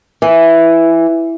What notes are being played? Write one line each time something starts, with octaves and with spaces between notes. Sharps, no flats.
E3